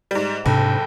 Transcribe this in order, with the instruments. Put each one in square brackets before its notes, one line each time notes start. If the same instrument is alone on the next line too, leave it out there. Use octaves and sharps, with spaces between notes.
[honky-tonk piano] G#2 G3
[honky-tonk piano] F#1 [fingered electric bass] G#2 C3 D4 [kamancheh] A4 G5